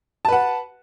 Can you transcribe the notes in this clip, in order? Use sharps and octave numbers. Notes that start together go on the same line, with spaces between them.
B4 F#5 A5